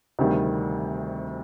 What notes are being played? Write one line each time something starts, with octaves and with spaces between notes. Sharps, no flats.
D2 C3 D#3 G3